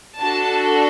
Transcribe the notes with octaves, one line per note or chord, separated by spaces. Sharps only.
D4 F#4 A4 A5